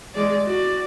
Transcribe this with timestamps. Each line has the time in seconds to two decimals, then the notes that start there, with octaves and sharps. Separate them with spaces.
0.15 G#3 D5
0.45 F#4 D5